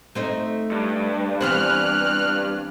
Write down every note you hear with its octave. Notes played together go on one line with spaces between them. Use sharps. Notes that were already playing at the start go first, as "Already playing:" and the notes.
A3 C4 D#4
G2
E3 B3 C4 F6 F#6